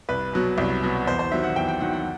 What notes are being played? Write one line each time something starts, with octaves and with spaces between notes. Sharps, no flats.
C2 B4
B2 F#3
C2
B2 F#3
E2 C5
C5
D#3 F#3 E5
F#5
E2 G5
G5
D#3 F#3 F#5
F#5